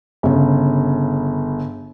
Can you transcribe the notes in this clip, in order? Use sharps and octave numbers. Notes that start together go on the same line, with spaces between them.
G1 C#3